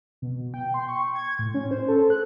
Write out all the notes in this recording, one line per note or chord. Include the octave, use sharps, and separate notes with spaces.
B2
G5
C6
C#6
G#6
A2
C#4
C5
A4
F#6